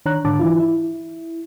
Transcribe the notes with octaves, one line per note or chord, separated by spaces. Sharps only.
D#3 D4 C#5 A#5 F#6
G#2 D3 D4 A5 D6
E3 E4 F4
E4